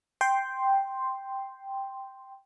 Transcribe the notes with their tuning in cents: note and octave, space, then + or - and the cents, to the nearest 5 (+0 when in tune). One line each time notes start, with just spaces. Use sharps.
G5 +0 C6 +0